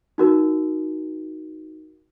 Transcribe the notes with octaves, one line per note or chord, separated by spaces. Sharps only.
D#4 F#4 A#4